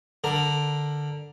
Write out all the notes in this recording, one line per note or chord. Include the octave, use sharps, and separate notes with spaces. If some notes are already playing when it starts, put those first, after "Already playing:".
D3 D4 A#4